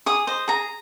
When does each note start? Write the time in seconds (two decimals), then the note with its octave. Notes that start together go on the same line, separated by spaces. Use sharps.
0.06 G#4 D#6
0.27 C5 D#5
0.48 G#4 A#5